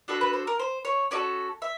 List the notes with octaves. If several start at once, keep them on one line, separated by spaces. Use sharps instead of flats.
D4 F#4 A4 B4
B4
C5
A#4
C5
C#5
C#4 F#4 A4 D5
E5